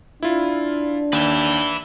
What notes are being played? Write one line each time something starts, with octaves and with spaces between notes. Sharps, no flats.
D4 E4 F4
D#2 B4 E5